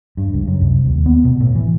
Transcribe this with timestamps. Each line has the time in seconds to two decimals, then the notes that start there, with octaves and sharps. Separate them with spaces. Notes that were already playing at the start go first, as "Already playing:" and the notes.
0.17 G2
0.34 C#2
0.47 F#2
0.61 C2
0.86 D#2
1.06 B3
1.24 B2
1.40 A2
1.55 E3